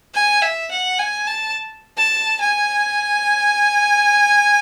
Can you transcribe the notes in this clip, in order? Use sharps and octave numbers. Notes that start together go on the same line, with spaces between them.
G#5
E5
F#5
G#5
A5
A5
G#5